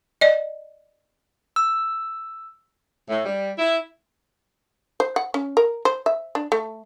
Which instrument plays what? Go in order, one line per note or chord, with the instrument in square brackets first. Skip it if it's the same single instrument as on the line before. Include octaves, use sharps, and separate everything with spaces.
[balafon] D5 D#5
[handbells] E6
[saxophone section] A2
G3
E4
[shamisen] C5
F#5
C#4
A#4
C5
E5
D4
A3